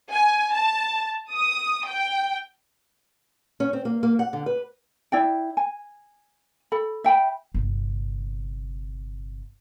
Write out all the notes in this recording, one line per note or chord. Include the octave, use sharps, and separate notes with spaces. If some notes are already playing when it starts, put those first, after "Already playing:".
G#5
A5
D#6
G5
C#4
C4
A#3
A#3
F#5
D3
B4
E4 D5 G5
G#5
A4 B5
E5 G5 A#5 B5
G1 C3